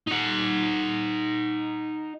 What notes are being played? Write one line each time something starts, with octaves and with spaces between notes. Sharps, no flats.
D#4 F#5